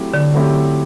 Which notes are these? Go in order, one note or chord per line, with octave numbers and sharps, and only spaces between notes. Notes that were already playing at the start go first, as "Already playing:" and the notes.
Already playing: F#3 A3 C4 E4 G4
D3
F#3 A3 C4 E4 G4